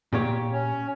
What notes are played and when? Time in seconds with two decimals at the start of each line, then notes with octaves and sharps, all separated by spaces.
0.13 A#2 G4 C#5
0.51 C#4